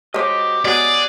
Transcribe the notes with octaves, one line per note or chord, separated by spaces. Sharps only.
G#3 F#4 G4 C5 C#5 D#5
F#3 G#3 B3 G4 G#4 D5 F#5